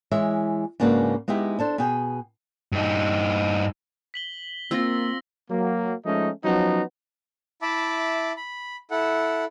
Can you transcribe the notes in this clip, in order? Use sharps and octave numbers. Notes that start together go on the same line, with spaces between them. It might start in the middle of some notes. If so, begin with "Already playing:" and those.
E3 G#3 C#5 E5
G#2 C#3 A#3 D4 F#4 B4
G#3 B3 D#4 E4 G4
D4 A4 C5
B2 G#4 G5 G#5
G2 D#4
B6 F#7 G7
A#3 C4 F4 E6 A#6
F#3 A#3
F3 G#3 A3 C#4 D#4
F3 F#3 B3 C#4 D#4 F#4
E4 E5 A5 B5 D6
B5
E4 A4 F#5